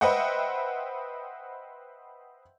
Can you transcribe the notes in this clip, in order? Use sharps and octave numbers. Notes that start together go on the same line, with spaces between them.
B4 C5 D#5 E5 F#5 G5